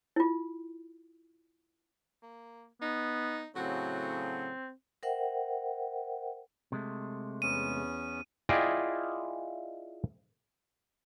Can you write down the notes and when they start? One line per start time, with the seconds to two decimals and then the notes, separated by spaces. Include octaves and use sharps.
0.16 E4 F4
2.23 A#3
2.82 B3 D#4
3.56 A2 C#3 F#3 C4 F#4
5.03 A#4 C5 E5 F#5 G5
6.72 C3 G#3 A3
7.42 E2 B3 C#4 D#7
8.49 E4 F4 G#4 D5 D#5 G5